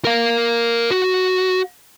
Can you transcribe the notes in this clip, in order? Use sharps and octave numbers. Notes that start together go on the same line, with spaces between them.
A#4 F5
F#4